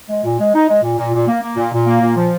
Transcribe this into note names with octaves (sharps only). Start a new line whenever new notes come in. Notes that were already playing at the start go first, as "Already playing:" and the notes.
G#3
A#2
G#3
D#4
G#3
A#2
A#2
A#2
A#3
A#3
A#2
A#2
A#3
A#2
F3